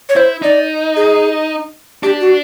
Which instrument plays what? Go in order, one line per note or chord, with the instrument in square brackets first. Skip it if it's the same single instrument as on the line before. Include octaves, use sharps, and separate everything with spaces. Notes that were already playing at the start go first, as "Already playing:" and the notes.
[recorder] C#5
[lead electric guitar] E4 [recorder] C5
[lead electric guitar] D#4 [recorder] D5
[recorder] G#4
[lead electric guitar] D4 [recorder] G4
[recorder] F#4